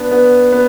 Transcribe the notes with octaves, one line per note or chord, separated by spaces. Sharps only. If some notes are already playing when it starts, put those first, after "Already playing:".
Already playing: B3 D4
B3
B3